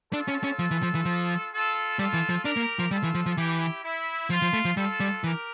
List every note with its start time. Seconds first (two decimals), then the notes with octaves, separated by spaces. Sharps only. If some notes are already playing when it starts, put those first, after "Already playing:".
0.13 D4 F4 A4
0.28 C#4
0.44 C#4
0.59 F3
0.71 E3
0.83 F3
0.95 E3
1.05 F3
1.52 F4 A4
1.98 G3 F4 A4
2.13 E3
2.29 F3
2.44 D4 G4 A#4
2.57 A#3
2.79 F3
2.91 G3 F4 A4
3.03 E3
3.15 F3
3.26 F3
3.37 E3 E4 G4
3.83 E4
4.30 F3 F4
4.42 F3
4.53 A3
4.65 F3
4.76 G3 F4 A4
5.00 G3
5.23 E3 G4 A#4